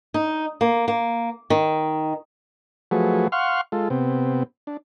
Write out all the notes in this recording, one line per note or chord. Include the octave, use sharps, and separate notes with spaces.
D#4
A#3
A#3
D#3
F3 F#3 A3 F#4 G#4 B4
F5 F#5 C6 C#6 F6
G#3 F4 A4
C3 B3 C4
D4